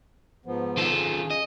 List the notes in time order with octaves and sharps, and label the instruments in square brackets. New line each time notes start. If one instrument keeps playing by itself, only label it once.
[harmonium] G#2 F3 B3
[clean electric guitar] D#3 F4 A4
[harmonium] C#3 G#4
[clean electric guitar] D#5